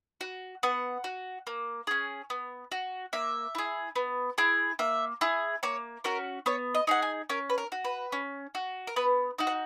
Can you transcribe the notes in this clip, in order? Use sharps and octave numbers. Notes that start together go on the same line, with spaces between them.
F#4
B3 F#5
F#4
A#3
C#4 G#4
B3
F#4
A#3 E5
E4 G#4
B3
E4 G#4
A#3 E5
E4 G#4
A#3 C#5
C#4 F#4 A#4
B3 C#5
D#5
D#4 G#4 F#5
G#5
C#4 A#4
B4
A#4
F#4
B4
C#4
F#4
A#4
B3 B4
D#4 F#4
F#5